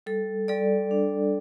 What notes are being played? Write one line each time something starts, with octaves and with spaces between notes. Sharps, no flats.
G3 A4
G3 A4 D5
D4